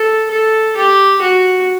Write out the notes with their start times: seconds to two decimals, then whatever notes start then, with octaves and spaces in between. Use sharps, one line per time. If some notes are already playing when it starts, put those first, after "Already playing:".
Already playing: A4
0.31 A4
0.76 G4
1.21 F#4